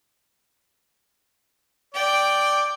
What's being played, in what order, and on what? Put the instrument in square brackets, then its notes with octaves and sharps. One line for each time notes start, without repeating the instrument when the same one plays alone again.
[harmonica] D5 [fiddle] G5